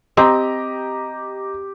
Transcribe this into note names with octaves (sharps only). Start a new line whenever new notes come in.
C4 G4 D#5 A#5